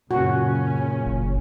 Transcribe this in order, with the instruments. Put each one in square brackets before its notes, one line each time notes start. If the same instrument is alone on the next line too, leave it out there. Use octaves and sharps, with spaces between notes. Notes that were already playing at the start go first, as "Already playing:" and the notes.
[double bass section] F#2 C#3 C#4 [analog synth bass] A#2 [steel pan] F#4
[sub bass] F#1